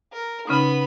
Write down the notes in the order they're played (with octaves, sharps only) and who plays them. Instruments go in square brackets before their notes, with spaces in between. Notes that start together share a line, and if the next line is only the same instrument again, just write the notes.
[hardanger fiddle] A#4
[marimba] C#3 C#4 D#4 [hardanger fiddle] B3 B5